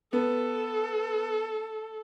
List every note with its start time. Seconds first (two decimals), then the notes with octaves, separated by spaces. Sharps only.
0.13 B3 A4